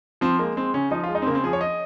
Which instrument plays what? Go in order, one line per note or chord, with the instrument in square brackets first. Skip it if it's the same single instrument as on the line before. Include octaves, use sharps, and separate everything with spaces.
[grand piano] F3 C4
G#3 A#3
G#3 C4
C#3 C#4
F3 D#4
F4
G#3
D#4
C4
C#3 A#3
C4
F3 G#4
C#5
D#5